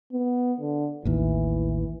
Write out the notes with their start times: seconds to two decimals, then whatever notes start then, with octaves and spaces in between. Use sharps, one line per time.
0.12 B3
0.60 D3
1.05 A1 D#2 E3